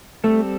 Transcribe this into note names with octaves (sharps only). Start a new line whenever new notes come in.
G3 A3 C4 A4